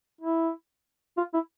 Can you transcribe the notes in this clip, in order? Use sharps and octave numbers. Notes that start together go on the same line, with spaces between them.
E4
F4
E4